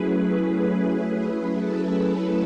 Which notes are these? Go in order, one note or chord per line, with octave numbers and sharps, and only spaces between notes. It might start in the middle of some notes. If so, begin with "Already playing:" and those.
Already playing: F#3 A3 C#4 E4 G#4 B4
G#4
G#4
G#4
B4
A4
B4